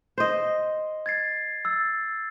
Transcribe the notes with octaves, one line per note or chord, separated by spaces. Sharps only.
C5 D#5
G#6 A6 C7
E6 A6